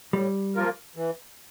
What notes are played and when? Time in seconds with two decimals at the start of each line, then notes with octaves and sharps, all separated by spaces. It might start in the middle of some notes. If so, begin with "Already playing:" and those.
0.13 A2 G3
0.55 F3 A#3 F4 A#4
0.96 E3